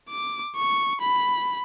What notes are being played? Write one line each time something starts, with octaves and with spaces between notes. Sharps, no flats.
D6
C#6
B5